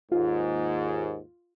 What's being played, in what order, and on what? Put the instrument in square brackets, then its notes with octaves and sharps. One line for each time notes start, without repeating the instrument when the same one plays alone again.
[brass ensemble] D#2 G#2 [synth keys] F4